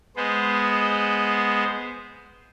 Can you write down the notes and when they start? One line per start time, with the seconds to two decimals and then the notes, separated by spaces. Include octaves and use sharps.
0.16 G#3 B3 C5